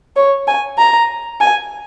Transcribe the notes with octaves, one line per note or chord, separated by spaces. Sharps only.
C#5
G#5
A#5
G#5